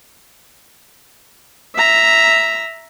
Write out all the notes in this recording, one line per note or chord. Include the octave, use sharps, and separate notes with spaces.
E5 A#5